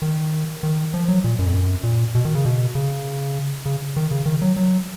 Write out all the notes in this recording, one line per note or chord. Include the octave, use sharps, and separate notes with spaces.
D#3
D#3
F3
F#3
A#2
F#2
F2
F#2
A#2
B2
D#3
C#3
B2
C#3
C#3
D#3
C#3
D#3
F#3
F#3